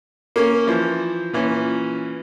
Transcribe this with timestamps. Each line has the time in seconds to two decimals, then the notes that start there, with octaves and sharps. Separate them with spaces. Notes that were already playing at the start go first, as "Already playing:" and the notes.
0.36 A#3 C#4
0.67 E3 F3 C5
1.33 A#2 E3 C#4